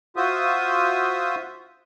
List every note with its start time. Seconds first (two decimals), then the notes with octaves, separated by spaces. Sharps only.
0.16 F4 F#4 C5 E5 D#6